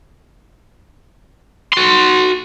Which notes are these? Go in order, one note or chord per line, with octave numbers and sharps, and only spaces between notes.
F#4 C6